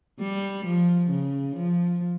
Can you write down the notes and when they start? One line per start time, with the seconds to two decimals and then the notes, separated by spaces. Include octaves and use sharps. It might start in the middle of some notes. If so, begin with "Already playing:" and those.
0.20 G3
0.65 F3
1.10 C#3
1.56 F3